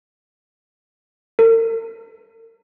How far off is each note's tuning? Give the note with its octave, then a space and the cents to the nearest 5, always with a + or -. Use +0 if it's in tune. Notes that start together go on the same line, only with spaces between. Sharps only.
A#4 -45